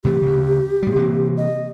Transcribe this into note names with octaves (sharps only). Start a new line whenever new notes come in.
C3 E3 A3 G4
D2 C#3
A2 G3
C3 E3 A#3
D#5